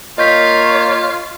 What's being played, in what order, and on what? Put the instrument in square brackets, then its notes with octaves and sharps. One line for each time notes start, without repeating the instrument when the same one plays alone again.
[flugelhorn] A#3 [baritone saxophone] F4 [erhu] C#5 [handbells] D#5 G6 B6